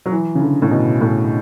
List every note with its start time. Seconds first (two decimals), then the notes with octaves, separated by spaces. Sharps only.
0.06 F#3
0.11 E3
0.35 C#3
0.42 D3
0.62 A2
0.71 B2
1.01 A2